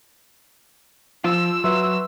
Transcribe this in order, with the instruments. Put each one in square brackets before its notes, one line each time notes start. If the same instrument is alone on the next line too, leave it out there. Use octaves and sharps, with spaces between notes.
[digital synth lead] F3 [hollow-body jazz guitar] F4 [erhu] E6
[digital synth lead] F#3 [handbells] B4 E5 C6